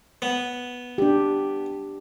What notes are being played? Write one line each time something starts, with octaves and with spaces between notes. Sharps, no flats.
B3
D4 G4